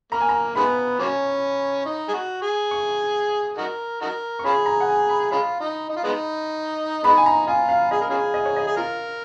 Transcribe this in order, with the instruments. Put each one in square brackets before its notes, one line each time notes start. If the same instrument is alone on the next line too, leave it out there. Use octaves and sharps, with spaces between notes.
[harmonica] A#3 [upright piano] A#5
[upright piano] G#5
A#5
[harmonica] D#3 G#3 B3 [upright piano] B5
[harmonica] F#3 A#3 C#4
D#4
G#4
F#4
G#4
[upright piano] C#6
[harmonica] D#4 F#4 A#4
D#4 F#4 A#4
[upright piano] C#6
[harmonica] C#4 F4 G#4 [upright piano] B5
[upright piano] A#5
F#5
G#5
B5
[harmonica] G#3 C#4 F4 [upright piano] B5
[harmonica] D#4
D#4
F4
G#3 B3 D#4
[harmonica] G#3 B3 D#4 [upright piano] B5
[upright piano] G#5
A#5
[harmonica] F4 [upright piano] G#5
[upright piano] F5
[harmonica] G#4 [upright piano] D#5
[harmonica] A#4
C#4 F4 G#4
[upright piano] D#5
C#5
D#5
[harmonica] G#4
[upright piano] F4 [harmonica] A#4